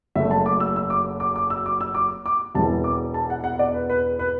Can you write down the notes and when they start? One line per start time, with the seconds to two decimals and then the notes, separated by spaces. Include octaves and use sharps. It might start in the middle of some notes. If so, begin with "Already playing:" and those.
0.15 F#1 F#2 F#3 A3 E5
0.31 A5
0.46 D6
0.60 E6
0.76 E6
0.90 D6
1.20 D6
1.36 D6
1.50 E6
1.66 D6
1.81 E6
1.95 D6
2.26 D6
2.55 E1 E2 E3 A5
2.84 D6
3.14 A5
3.30 F#5
3.44 F#5
3.59 D5
3.74 B4
3.90 B4
4.19 B4